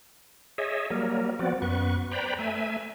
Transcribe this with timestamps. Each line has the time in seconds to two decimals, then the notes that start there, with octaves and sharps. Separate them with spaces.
0.58 G#4 C#5 D#5 E5
0.90 F#3 G3 A#3 A#4
1.39 F3 B3 C4 F#4 D5
1.62 F#2 B3 B4 C#6
2.11 B4 C5 D5 G5 A#5 B5
2.39 A3 E5 G#5